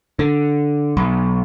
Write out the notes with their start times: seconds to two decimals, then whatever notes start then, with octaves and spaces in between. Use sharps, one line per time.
0.19 D3
0.97 B1